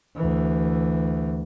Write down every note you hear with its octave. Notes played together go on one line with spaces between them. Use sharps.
D2 E3